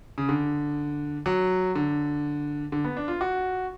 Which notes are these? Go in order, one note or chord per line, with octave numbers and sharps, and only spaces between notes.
C#3
D3
F#3
D3
D3
B3
D4
F4
F#4